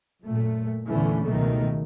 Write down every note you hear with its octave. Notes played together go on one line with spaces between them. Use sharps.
F#2 A#2 A3
E2 A#2 D3 E3 A3 C#4
C#2 B2 D#3 F#3 A3